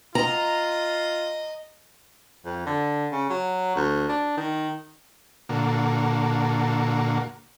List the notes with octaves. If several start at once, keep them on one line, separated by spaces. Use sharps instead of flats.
F4 D#5 A#5
F2
D3
C#3
F#3
D2
D4
D#3
A#2 D3 A#3 F#4 A4